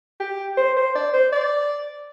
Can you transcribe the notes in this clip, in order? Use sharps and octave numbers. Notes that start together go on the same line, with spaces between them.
G4
C5
C5
D5
C5
D5